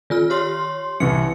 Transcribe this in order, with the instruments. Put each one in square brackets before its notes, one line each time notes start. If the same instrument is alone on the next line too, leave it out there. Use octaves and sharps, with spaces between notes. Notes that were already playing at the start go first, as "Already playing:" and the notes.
[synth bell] D#3 F4 F6
G4 C#5 C6
[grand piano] C2 E3 [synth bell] C#7